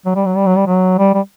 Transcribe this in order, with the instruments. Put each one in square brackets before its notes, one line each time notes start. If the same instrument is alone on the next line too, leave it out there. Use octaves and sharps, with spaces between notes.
[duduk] F#3
G3
F#3
G3
F#3
G3
F#3
G3
G3